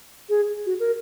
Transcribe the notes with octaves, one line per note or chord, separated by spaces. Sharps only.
G#4
F#4
A#4